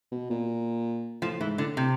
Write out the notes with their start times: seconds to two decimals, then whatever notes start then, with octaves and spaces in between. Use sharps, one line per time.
0.11 B2
0.30 A#2
1.22 A2 F3
1.40 G#2 E3
1.58 A2 D3
1.77 C3